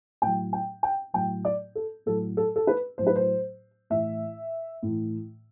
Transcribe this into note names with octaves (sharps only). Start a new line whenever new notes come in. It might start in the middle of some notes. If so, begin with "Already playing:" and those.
A2 F#3 G5
G5
G5
A2 F#3 G5
D5
A4
A2 F#3 A4
A4
A4
B4
A2 F#3 C5
B4
C5
A2 E3 E5
A2 E3